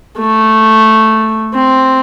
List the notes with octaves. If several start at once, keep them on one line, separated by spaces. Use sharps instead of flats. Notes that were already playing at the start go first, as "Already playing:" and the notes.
A3
C4